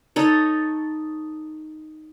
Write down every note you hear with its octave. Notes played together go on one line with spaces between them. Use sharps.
D#4 A4 C#5